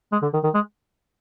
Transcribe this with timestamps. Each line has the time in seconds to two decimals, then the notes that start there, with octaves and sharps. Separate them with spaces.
0.12 G#3
0.22 D3
0.33 D#3
0.44 D#3
0.55 G#3